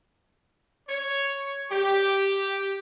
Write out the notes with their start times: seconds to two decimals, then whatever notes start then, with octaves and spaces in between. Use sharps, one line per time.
0.89 C#5
1.72 G4